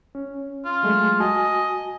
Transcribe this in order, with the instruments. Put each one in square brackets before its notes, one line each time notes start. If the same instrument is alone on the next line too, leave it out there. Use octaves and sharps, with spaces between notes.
[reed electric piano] C#4
[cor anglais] F4
[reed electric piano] F#3 G#3 A3
[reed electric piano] F#4 G#5 A5 [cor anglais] D#5